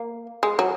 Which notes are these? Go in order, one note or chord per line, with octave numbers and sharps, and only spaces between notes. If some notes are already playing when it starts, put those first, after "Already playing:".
Already playing: A#3
G#3
F#3